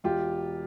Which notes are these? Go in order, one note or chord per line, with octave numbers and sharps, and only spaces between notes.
E1 F4 G4